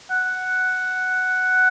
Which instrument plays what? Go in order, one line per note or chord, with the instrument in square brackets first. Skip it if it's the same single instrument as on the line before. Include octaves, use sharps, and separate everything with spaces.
[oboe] F#5